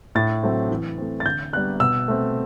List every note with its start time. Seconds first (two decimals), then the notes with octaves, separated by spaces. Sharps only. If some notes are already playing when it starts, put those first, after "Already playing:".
0.15 A2 A6
0.43 F#3 A3 C4
0.71 E3
0.98 A3 C4
1.20 A6
1.25 D3 G6
1.53 G3 B3 F#6
1.80 B2 E6
2.08 A3 C4